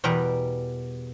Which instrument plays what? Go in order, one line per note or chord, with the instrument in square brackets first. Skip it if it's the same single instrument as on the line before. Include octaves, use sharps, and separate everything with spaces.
[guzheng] E2 B2 G3 A#4 F#5 A#5